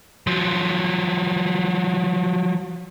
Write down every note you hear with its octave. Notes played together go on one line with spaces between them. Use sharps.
F3 F#3